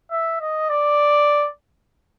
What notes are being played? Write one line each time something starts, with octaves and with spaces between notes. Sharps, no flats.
E5
D#5
D5